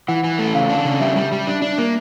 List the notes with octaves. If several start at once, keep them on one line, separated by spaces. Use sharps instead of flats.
E3 F#5
E3
A3
C#3 F5
D4
C#3
G3 E5
G3
G3
D4
D4
A#3